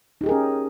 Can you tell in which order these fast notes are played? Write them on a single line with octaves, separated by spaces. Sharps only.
D#4 G4 G#4 A#4 C#4